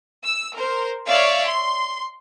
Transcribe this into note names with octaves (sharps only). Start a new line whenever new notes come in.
E6
A#4 C5
C#5 D5 E5 F5
C6